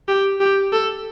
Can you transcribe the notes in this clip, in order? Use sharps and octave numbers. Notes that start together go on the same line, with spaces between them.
G4
G4
A4